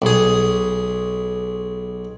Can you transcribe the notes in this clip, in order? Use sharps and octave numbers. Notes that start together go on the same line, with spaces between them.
B1 G#4